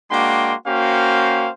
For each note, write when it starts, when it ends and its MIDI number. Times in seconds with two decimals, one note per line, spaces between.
0.11 0.55 56
0.11 0.55 58
0.11 0.55 62
0.11 0.55 66
0.11 0.55 79
0.11 0.55 84
0.67 1.50 58
0.67 1.50 61
0.67 1.50 66
0.67 1.50 72
0.67 1.50 77
0.67 1.50 79